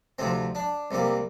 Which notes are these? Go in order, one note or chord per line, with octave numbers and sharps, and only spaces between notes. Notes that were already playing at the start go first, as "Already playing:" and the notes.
D2 C3 F3 C4
D4
C2 C3 G3 A#3